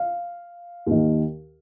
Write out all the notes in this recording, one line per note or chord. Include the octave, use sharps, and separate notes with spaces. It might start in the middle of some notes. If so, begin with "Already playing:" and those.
Already playing: F5
D#2 D#3